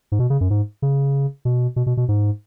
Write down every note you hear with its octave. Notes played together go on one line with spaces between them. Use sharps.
G#2
B2
C#3
F#2
G#2
C#3
B2
B2
B2
B2
G#2